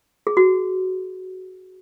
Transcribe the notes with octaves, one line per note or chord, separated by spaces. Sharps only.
G#4
F#4